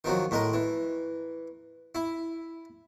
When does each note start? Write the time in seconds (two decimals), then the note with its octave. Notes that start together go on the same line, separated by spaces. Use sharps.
0.04 D#3 F3 F#3
0.31 A2 G#3 A#4
0.53 E3
1.95 E4